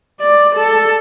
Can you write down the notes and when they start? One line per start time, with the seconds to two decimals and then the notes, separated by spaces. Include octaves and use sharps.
0.20 D5
0.56 A4